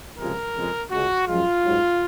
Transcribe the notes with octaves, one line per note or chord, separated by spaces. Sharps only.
C#2 C3 F3 G#3 A#4
F2 C#3 G#3
C#2 C#3 G#3 F#4
F#2 F3 G#3 F4
G#2 F#3